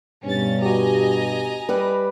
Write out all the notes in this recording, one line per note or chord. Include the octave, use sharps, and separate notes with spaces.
G2 B2 C#4 A6
F#4 G4 D#5 G#5 A#5
G3 B4